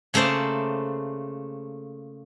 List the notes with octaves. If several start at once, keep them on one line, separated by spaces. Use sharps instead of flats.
C#3 A3 A#3 C5 D5